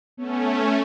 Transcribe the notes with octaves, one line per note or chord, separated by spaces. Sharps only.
A3 B3 C#4